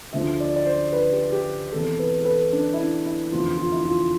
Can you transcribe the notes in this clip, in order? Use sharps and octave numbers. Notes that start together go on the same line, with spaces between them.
D2 D3 F3 E5
D5
D5
C5
B4
G4
G4
E1 E2 C3 E3 A4
B4
A4
B4
D4
E4
D4
E4
F1 E2 D3 F3 F4
F4
E4
F4